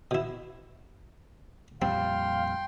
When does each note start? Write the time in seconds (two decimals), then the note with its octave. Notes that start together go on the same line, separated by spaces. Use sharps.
0.11 B2 E4
1.82 F2 A#2 G3 C4 F5 G5 C6